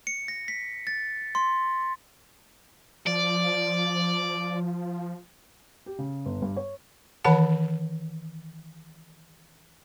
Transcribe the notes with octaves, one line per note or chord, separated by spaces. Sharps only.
C#7
A#6
B6
A6
C6
F3 D5
G4
C#3
G1
G2
C#5
D#3 E3 C#5 F#5 A5